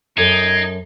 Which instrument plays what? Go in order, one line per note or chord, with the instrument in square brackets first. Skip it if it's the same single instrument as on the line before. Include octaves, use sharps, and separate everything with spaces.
[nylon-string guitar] F#2 A4 C5 [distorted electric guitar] D#4 [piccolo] G#6 [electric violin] C7 D7